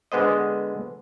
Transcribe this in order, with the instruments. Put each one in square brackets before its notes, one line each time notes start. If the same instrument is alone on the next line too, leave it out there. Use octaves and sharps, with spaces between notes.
[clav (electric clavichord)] D3 G#3 B3 C5 D#5